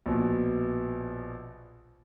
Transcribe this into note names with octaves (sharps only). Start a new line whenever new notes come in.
A#1 B2